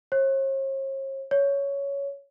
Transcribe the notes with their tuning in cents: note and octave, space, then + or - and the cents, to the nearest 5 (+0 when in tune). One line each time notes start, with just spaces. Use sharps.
C#5 -45
C#5 +10